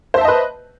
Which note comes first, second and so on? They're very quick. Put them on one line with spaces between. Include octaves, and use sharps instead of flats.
C5 E5 A5 D#5 B4